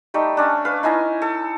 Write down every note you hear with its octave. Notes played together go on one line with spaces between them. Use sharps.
G3 A3 D#4
C#4 D4
B4 F5
D#4 E4 G#5 A#5
A4